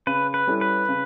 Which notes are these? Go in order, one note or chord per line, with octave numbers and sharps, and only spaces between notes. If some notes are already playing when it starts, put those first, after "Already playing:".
C#3 B4
B4
G3 C#4 E4 A4
B4
C#3